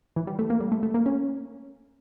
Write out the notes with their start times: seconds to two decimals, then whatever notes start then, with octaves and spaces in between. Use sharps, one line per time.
0.16 E3
0.27 G3
0.39 A3
0.50 A#3
0.60 G3
0.72 A3
0.83 A3
0.94 A#3
1.06 C#4